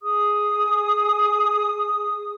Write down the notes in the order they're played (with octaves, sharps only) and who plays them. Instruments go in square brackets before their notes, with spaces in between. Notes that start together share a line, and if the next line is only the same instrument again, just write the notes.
[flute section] G#4 D#6